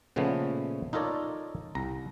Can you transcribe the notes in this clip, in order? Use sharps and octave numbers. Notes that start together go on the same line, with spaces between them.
A#2 C#3 F3 A3 B3
D#4 F4 A4 A#4 C#5 D5
C2 A#5